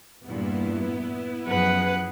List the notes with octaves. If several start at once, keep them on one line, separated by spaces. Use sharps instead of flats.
E2 G2 A#2 B3 E4
F#2 F3 G#4 B4 F#5